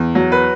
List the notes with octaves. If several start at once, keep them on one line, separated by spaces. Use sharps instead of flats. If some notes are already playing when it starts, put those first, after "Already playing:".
Already playing: E2
F#3
B4